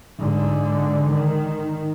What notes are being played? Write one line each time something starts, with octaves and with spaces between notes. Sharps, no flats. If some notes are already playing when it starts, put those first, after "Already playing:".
G#2 D3
D#3